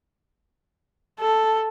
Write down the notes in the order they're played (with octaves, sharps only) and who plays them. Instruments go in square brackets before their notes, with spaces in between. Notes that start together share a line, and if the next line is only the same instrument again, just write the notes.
[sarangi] A4